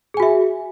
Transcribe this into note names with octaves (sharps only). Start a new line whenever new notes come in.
F#4 G#4 E5 G#5